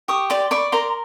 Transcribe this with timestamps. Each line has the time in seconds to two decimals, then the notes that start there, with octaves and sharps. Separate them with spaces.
0.08 G4 C#6 D#6
0.30 D5 C6 D6
0.51 D5 B5 C#6
0.72 A#4 A#5 C6